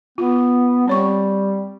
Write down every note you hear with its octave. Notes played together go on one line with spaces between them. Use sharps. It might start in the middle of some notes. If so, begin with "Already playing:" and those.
B3 F4
G3 C4 C#5 C#6